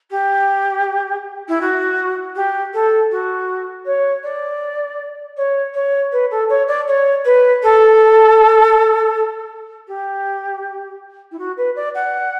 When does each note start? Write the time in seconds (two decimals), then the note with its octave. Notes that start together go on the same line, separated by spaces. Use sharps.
0.10 G4
1.48 E4
1.61 F#4
2.35 G4
2.73 A4
3.11 F#4
3.85 C#5
4.23 D5
5.37 C#5
5.74 C#5
6.12 B4
6.30 A4
6.49 C#5
6.67 D5
6.87 C#5
7.24 B4
7.62 A4
9.87 G4
11.31 E4
11.38 F#4
11.57 B4
11.75 D5
11.94 F#5